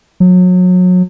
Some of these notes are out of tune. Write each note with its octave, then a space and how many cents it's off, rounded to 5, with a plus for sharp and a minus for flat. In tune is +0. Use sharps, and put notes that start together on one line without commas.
F#3 -30